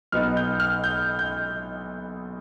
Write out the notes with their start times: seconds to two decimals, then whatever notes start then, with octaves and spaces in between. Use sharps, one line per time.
0.12 B1 B2 B3 D#4 F6
0.37 G6
0.60 F6
0.84 G6
1.19 G6